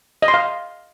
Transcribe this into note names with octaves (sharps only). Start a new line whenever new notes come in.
D#5
C6
F5